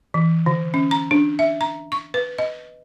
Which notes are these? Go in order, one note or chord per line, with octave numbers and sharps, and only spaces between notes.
E3
D3
C#4
A#5
D4
E5
A#5
C#6
B4
D#5